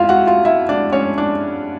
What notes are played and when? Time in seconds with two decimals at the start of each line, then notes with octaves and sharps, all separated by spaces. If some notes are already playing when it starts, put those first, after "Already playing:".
Already playing: F2 E4 F4 E5 F5
0.09 F#4 F#5
0.27 F4 F5
0.45 E4 E5
0.69 D4 D5
0.92 C#4 C#5
1.18 D4 D5